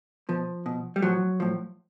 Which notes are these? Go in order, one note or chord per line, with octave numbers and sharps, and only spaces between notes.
B2 F3
B2
G3
A2 F3 F#3
A2 F3